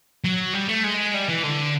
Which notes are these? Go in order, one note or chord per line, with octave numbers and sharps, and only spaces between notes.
F#3
G3
A3
G#3
G3
E3
D3